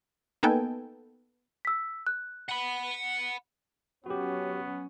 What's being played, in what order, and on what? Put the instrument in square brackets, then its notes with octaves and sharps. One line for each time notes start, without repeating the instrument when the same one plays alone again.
[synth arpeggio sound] A#3 B3 D#4 A4 G5 G#5
[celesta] E6 B6
F#6
[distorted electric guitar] F#5 B5
[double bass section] F#3 C#4 [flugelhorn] B3 [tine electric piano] F#4 G4